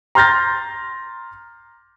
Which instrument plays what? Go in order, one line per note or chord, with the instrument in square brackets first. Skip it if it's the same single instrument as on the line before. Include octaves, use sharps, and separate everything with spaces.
[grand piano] A#5 C6 F6 G6 A6 A#6